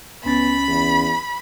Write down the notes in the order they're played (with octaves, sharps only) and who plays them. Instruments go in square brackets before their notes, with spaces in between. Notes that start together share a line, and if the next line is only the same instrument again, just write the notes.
[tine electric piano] C#2 C#4 A6 [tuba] B3 [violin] B5
[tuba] E2